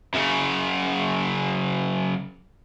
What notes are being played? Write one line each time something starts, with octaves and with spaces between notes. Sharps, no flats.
F#2 C#3